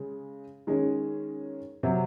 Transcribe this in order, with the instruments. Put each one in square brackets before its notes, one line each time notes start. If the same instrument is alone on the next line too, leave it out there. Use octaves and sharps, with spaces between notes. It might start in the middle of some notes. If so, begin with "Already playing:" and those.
Already playing: [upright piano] C#3 G#3
D#3 G#3 C#4
C3 F#3